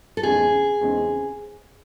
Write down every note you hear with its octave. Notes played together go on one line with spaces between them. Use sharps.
A4
E2 C#3 G#3 C4 D#4 G#4
E2 C#3 G#3 C4 D#4